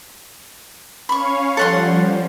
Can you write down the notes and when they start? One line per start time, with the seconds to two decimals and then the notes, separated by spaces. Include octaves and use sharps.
1.09 C#4 C#5 F5 B5 C#6
1.57 F3 G3 A4 F#5 C6